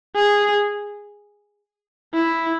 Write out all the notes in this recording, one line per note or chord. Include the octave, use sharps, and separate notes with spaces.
G#4
E4